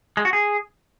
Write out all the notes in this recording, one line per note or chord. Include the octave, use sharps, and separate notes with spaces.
G#3
F#4
G#4